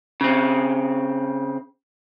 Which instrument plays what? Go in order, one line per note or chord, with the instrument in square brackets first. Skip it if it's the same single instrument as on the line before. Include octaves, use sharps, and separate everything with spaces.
[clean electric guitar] C#3 C4